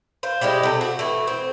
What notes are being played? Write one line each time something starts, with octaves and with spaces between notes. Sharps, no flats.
C5 F5
G3 G#3 E4 G4
C3 A4
F#4
E3 A3
C4